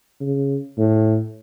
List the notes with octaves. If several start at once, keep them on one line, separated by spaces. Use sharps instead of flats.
C#3
A2